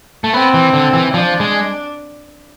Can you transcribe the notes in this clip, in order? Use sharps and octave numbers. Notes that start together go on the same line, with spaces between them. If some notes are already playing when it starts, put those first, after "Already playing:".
A3
B3 C4
E3
D3
E3
F3 D4
G#3